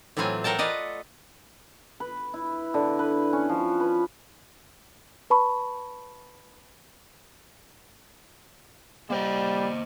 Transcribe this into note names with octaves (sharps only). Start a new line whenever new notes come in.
A2 E3 F#3 C4 F4 G#5
A3 A4 A#4 F#5 G5 A5
F4 B4 D5 D#5 F#5
B4
E4
D3
B4
C#4
F3
B4
B4 A5 B5 C#6
G3 A#3 C5 D#5